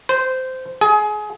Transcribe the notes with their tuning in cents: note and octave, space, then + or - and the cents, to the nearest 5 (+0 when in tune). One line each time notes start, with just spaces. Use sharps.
C5 -15
G#4 +25